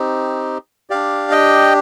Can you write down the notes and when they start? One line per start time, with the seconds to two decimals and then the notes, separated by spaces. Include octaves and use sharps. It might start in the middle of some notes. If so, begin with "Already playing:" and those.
Already playing: C4 D#4 G4
0.90 D4 G4 D5 F5
1.31 D#5 G5